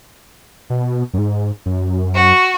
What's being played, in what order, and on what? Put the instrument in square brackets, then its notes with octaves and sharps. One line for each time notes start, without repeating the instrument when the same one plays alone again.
[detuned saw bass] B2
F#2
G#2
F#2
[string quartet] F#4